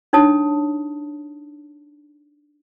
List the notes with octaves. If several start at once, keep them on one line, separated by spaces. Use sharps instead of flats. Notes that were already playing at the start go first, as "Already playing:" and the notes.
D4 D#4 C#5 A5 D#6